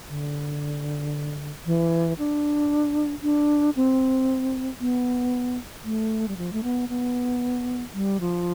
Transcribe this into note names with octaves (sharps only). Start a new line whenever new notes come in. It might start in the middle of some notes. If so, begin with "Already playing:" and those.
D3
E3
D4
D4
C4
B3
A3
G3
F3
A3
B3
B3
G3
F3